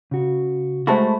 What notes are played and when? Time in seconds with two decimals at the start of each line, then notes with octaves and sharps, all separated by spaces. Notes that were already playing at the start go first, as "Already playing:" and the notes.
0.11 C#3 F#4
0.87 G#3 A3 F#4 C5 A5 B5